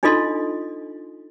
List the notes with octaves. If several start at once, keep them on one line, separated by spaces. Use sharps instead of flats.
D4 D#4 F4 A4 D#5 C6